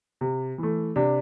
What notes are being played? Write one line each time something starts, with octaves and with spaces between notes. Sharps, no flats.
C3
E3 A3
C3 D4